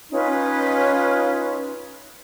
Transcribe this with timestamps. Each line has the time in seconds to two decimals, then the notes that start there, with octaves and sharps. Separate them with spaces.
0.11 C#4 D#4 F4 B4